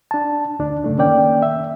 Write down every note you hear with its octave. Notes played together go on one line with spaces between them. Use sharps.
D4 A5
D2 D4
F#2 C#3 A3 D4
D#3 A#3 C#4 D5 G5
E5